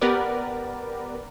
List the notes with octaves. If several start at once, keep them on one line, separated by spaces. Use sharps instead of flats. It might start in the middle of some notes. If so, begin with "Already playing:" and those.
B3 G4 A#4 B4 D5